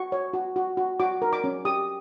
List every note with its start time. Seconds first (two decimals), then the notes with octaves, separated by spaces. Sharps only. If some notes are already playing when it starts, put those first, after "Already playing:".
Already playing: F#4 C#6
0.12 C#5
0.33 F#4
0.56 F#4
0.77 F#4
1.00 F#4 D6
1.22 A#4
1.33 D6
1.44 C#4
1.65 G4 D#6